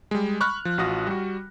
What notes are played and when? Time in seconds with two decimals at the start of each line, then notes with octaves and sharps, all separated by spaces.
0.11 G3 G#3
0.41 B5 C#6 F6 F#6
0.65 F3
0.78 A1 F4 F#4 D#6 A#6
1.07 G3 F#4